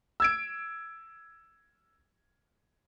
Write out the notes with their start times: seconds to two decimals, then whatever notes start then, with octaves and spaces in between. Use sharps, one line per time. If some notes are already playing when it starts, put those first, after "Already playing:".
0.20 E6 G#6 D7